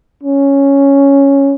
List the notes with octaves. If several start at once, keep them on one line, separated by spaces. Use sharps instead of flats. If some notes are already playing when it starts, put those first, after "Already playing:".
C#4